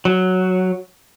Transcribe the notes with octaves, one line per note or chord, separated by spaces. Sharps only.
F#3